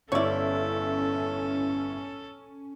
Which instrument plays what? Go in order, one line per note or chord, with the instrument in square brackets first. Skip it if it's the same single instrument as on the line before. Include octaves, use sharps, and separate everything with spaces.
[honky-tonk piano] G1 E4 [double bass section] C#4 [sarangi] A4 [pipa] C#5 D5